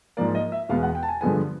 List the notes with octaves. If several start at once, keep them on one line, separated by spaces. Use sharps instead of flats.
G#2 F3 A#3 D5
D#5
E5
E2 B2 G#3 B3 F5
F#5
G5
A5
G#5
G2 D3 F3 G#3 B3 G#5